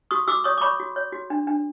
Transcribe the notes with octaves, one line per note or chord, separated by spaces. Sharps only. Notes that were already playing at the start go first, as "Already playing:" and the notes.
F#4 C#6 D#6
F#4 D6 E6
C#5 C#6 D#6
D6
C#5 B5 C#6
F#4
C#5
F#4
D4
D4